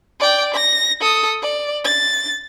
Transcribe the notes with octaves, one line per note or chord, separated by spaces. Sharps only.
D5 G5
A#6
A4 D#6
D5
A6